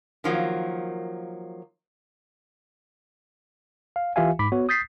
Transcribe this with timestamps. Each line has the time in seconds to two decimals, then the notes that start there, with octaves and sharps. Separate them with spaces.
0.24 D#3 F3 F#3 A#3
3.96 F5
4.16 E3 F4 G4 E5 F5 G#5
4.39 G#2 B5 D6 B6
4.52 B3 F#4 C#5
4.69 D#6 G6 A6 B6 C7